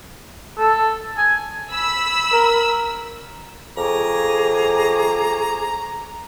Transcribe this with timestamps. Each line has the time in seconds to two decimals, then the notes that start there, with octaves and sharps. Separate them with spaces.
0.58 A4
1.18 G#5
1.73 B5 E6
2.33 A#4
3.77 F2 G#4 A#5 C#6 D6